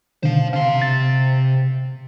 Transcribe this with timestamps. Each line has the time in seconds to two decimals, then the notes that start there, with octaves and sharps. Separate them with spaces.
0.23 B2 D3 D#3 C5 F5
0.53 C3 F5 C6
0.82 A6